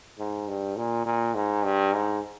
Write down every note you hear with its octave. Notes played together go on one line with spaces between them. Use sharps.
G#2
G2
A#2
A#2
G#2
G2
G#2